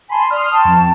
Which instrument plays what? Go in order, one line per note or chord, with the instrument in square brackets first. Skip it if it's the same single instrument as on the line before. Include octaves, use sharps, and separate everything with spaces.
[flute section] G#5 A5 [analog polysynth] B5 C6
[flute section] D5 [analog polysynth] C6 D#6 F6
[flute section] G5 A5 C#6
[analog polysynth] F2